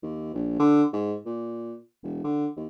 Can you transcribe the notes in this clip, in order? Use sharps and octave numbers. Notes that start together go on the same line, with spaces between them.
D#2
A#1
D3
G#2
A#2
E1
D3
D#2